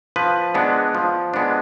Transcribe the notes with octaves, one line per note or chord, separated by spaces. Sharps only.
F3 B4
G#3 B3 D4
F3
G#3 B3 D4